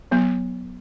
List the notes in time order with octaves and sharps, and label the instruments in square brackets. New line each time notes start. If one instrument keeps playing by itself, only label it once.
[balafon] F#3 B3